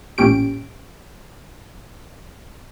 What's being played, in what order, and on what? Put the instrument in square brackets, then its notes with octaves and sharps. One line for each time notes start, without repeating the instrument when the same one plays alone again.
[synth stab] A1 A#2 C#4 G4 D7